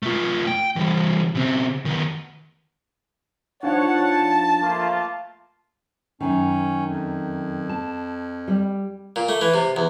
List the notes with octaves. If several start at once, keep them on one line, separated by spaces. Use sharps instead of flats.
A3 F4
G5
E3 G3
C#3 C4
D#3 B3
F3 D4 D#4 C#5 F#5 A5
A3 A#3 F4
F#2 D#3 C#4
F2
A5
G3
A#2
A3
E3
C3
E2